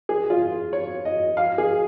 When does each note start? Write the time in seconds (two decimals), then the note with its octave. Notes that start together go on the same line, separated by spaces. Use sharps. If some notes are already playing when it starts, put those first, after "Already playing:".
0.09 G#4
0.30 F4
0.73 C#5
1.05 D#5
1.37 F5
1.58 G#4